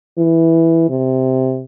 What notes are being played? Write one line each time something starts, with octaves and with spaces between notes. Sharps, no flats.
E3
C3